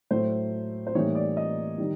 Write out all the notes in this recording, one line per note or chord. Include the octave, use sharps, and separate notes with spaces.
A2 F#3 A3 C5
C5
A2 E3 G3 A#3 D#4 C#5
D5
D#5
D#3 G3